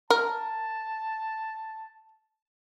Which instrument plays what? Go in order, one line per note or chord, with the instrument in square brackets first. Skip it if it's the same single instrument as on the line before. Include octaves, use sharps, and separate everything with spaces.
[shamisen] A#4 [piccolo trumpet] A5